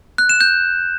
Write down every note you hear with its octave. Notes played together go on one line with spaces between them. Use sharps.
F#6
E7
G6